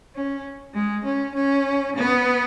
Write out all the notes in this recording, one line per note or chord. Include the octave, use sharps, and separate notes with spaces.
C#4
G#3
C#4
C#4
B3